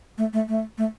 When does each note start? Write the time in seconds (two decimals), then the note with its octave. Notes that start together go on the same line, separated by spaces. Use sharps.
0.18 A3
0.33 A3
0.48 A3
0.78 A3